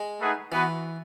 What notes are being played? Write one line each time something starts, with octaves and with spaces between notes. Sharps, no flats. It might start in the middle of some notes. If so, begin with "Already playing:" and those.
Already playing: G#3
A3 D#4 G#4 B4 F#5
E3 B3 F#4 B4